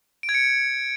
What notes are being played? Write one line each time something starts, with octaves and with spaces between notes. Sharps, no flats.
D7
G#6
C#7